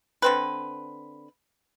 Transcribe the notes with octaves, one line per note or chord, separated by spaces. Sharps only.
D3 C4 B4